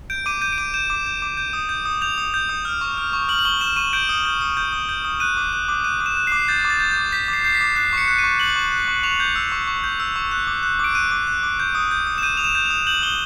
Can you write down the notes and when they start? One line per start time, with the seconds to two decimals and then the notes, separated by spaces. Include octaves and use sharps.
0.10 G6 D7
0.26 D6 D#7
0.42 G6 D#7
0.52 D7
0.58 D6 D#7
0.74 G6 E7
0.90 D6
1.06 G6
1.22 D6
1.37 G6
1.53 D#6
1.69 G6
1.85 D#6
2.01 G6 F7
2.18 D#6
2.34 G6
2.49 D#6
2.65 F6
2.81 C#6
2.98 F6
3.13 C#6
3.29 F6 F#7
3.39 F#7
3.45 C#6 G7
3.61 F6 E7
3.77 C#6 D#7
3.93 G6 D7
4.09 D#6
4.25 G6
4.41 D#6
4.57 G6
4.72 D#6
4.89 G6
5.05 D#6
5.20 F#6 D#7
5.37 D6
5.53 F#6
5.68 D6
5.84 F#6 D#7
6.00 D6
6.06 E7
6.17 F#6
6.27 D6 C7
6.48 G6 A6
6.65 D6
6.70 A6
6.80 G6
6.91 G6
6.97 D6
7.12 G6 B6
7.28 D6
7.33 C7
7.44 G6 C7
7.55 B6
7.61 D6
7.76 F#6 C7
7.93 C#6 C#7
8.08 F#6
8.18 D#7
8.24 C#6
8.39 F#6 F#7
8.56 C#6
8.72 F#6
8.88 C#6
9.03 C#6 F7
9.20 G6
9.36 E6
9.52 C#6
9.67 C#6
9.84 G6
10.00 E6
10.16 C#6
10.31 F#6
10.47 D6
10.63 F#6
10.79 D6 D7
10.95 F#6 D#7
11.11 D6
11.27 F#6
11.43 D6
11.60 G6
11.75 D#6
11.91 G6
12.07 D#6
12.18 E7
12.22 G6 D#7
12.37 D#6 F7
12.44 E7
12.55 G6
12.66 D#6 F7
12.87 G6 F#7
13.02 D#6 G7